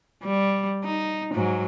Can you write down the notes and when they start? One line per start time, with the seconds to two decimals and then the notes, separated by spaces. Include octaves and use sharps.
0.23 G3
0.84 D#4
1.34 G#2 F#3